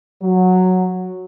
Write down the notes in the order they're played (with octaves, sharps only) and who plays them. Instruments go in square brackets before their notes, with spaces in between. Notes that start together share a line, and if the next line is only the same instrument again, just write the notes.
[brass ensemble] F#3